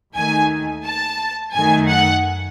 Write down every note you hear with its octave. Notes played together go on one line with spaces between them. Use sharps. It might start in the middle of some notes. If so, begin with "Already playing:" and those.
D#2 D#3 A3 G#5
A5
F#2 D#3 A3 G#5
F#5